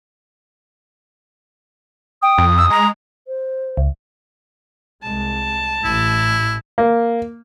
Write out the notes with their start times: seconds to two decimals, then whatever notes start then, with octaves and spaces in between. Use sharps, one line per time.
2.22 G5 D#6
2.38 F2
2.57 E6
2.70 G#3 A#5
3.27 C5
3.77 C#2
5.03 C2 G#3 A5
5.84 A1 E4
6.78 A#3